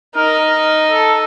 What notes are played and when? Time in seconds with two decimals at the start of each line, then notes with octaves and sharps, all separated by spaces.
0.15 D#4 A#4
0.90 A4